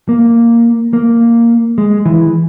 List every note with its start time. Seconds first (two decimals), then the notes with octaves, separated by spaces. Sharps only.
0.09 A#3
0.93 A#3
1.78 G#3
2.06 E3